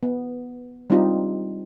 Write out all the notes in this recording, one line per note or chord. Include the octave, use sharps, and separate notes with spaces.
B3
G3 C4 D4 D#4 F4 G4